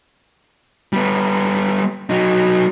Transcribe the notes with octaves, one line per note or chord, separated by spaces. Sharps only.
G3 B3
F#3 D#4